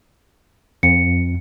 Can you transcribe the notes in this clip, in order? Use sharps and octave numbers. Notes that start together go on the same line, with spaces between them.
F2 C#7